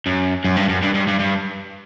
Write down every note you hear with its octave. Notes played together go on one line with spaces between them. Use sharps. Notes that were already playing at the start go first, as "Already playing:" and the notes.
F#2
F#2
G2
F#2
G2
G2
G2
G2